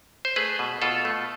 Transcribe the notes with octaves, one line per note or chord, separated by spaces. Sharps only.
C5
A3 G#4 B4
B2
B2 F4 A4
A3